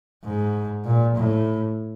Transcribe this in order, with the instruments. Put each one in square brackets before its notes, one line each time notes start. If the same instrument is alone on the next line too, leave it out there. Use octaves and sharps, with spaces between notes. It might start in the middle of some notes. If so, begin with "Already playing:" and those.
[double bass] G#2
A#2
A2